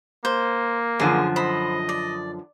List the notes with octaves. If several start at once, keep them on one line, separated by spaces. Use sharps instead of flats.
A#3 C5
F#2 D3 F3 G#4
C5 D#5 B5
D5